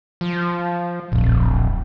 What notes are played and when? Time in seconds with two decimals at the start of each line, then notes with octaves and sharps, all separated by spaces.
0.21 F3
1.12 D1 A#1 F2